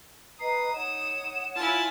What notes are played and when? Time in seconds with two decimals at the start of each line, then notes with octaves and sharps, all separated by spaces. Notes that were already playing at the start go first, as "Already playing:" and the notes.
0.40 B4 D#5 A#5 D#6 C7
0.74 D#4 C#5 F#5 E7
1.56 E4 F4 G#5 A5